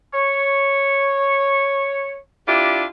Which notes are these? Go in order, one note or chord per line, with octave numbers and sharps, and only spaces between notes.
C#5
D4 E4 F4 G4